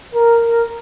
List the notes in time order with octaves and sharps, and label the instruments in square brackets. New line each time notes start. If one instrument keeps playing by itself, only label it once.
[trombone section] A#4